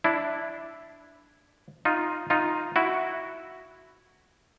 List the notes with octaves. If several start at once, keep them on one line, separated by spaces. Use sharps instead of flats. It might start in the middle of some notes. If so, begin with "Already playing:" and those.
D4 E4
D#4 F4
D#4 F4
E4 F#4